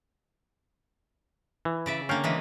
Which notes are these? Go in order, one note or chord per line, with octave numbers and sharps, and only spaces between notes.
E3
C#3 D5 E5
D3 A#3 C#4 F5 G5
C#3 E3 G#3